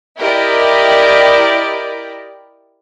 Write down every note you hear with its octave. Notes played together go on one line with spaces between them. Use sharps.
E4 G4 A#4 D5 D#5